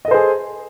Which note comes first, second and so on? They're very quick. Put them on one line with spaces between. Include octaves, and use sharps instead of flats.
D#5 A4 C5 G#4